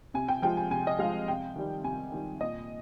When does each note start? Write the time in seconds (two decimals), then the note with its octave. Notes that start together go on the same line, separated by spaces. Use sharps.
0.14 C3 G#5
0.28 G5
0.42 F3 G#3 G5
0.57 G#5
0.71 C3 G#5
0.87 D#5
0.99 F3 G#3 F5
1.28 C3 G5
1.56 D#3 G3
1.84 C3 G#5
2.12 D#3 G3
2.41 A#2 D#5